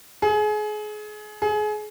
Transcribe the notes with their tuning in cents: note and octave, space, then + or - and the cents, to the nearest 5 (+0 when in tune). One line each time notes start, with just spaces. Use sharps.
G#4 +30
G#4 +30